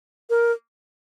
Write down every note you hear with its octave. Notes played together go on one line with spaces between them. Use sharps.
A#4